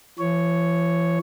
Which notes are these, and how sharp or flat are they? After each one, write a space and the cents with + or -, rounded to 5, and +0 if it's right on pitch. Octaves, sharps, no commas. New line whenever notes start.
E3 +45 C#5 +0